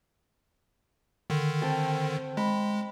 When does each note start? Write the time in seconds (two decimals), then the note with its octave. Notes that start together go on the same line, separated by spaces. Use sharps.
1.30 D3 D#3
1.61 C4 G5 A5
2.37 G#3 B5